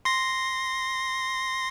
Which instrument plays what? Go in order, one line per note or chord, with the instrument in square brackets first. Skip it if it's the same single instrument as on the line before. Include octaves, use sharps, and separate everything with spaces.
[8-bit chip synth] C6 A#6